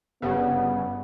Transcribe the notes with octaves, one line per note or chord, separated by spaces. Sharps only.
G1 G2 C#3 B3